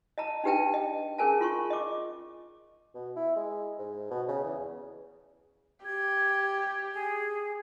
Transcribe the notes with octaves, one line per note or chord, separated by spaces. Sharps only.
D#5 A5 A#5
D4 D#4 G4 B4 G5 A5
D#5
C#4 G#4 A#4 G#5 A5
F4 C6 C#6
D#5 D6
B2
E4
G#3
G#2
B2
C#3
E2
G4 G#6
G#4